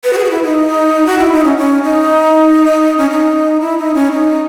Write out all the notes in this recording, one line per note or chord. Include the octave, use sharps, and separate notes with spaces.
B4
F#4
G#4
F#4
E4
D#4
F#4
E4
D#4
C#4
C#4
D#4
C#4
D#4
E4
D#4
C#4
D#4